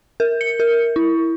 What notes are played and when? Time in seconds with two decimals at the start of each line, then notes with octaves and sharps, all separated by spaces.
0.20 A#4
0.41 C#7
0.60 A#4
0.96 E4